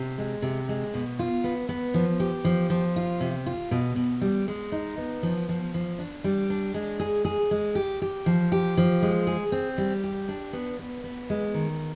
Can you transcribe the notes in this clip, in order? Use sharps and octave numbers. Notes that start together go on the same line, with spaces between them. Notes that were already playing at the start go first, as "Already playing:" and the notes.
Already playing: C3
G#3
C3
G#3
B2
F4
B3
B3
F3
G4
F3
F3
F4
C3
F4
B2
B2
G3
G#3
D#4
B3
F3
F3
F3
D4
G3
D4
G#3
G#4
G#4
G#3
G4
G4
F3
G4
F3
G#3
G#4
C4
G3
G4
D4
B3
B3
B3
G#3
D#3